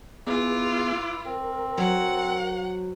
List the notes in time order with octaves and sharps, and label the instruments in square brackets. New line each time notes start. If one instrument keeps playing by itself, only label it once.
[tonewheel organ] B3 G#4 [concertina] E4 B4 D6 [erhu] F4
[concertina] C4 [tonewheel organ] A#4
[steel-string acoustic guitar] F#3 C5 [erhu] F#5